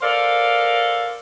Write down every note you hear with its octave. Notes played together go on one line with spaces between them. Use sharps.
A4 A#4 C5 D5 F5